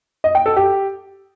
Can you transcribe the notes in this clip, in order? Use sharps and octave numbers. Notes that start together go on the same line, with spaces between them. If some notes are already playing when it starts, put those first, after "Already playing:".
D#5
G5
A4
G4